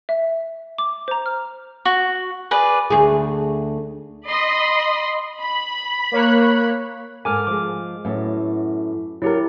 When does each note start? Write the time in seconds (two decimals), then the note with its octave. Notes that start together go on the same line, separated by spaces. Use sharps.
0.09 E5
0.78 D6
1.08 C5 A#5
1.26 F6
1.85 F#4 C#6
2.51 G#4 B4 D5
2.90 D2 G#4
4.28 D#5 B5 C6
5.40 B5
6.12 A#3 C#5 F#6
7.25 G#2 A4 A#4 G#5 D6 F6
7.47 F3 G#3 D6
8.05 F#2 A2 B3
9.22 F#3 D4 E4 G4 A#4